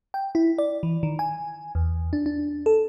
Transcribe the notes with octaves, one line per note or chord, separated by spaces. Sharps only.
G5
E4
D5
E3
D#3
G#5
E2
D4
D4
A4